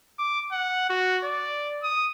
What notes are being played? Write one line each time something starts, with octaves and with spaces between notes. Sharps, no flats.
D6
F#5
F#4
D5
D#6